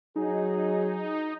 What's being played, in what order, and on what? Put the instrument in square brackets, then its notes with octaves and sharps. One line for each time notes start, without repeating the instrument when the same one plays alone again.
[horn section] F#3 G#4 [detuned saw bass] D#4